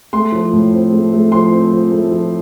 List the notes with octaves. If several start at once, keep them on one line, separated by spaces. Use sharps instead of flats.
A3 C6
F3
A2
C4
A3
A3
F3 C6
C4
F3
A3
F3